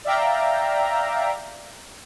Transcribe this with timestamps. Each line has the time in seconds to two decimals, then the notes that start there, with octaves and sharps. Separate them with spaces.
0.04 D5 E5 F5 G5 A#5